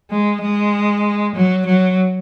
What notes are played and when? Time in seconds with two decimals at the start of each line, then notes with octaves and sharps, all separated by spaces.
0.11 G#3
0.42 G#3
1.36 F#3
1.66 F#3